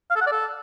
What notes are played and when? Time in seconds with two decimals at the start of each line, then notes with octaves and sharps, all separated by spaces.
0.10 F5
0.16 A4
0.21 F#5
0.26 D5
0.32 A4